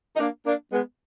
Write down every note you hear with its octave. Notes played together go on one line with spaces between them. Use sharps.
D#4
A#3 D4
A#3 D4
G#3 B3